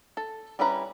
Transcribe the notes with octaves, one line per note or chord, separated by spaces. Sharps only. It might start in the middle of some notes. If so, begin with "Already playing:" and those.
A4
G3 C#4 E4 B4 A#5